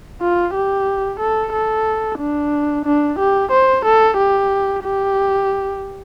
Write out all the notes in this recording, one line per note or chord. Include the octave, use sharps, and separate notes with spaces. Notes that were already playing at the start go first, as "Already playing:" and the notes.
F4
G4
A4
A4
D4
D4
G4
C5
A4
G4
G4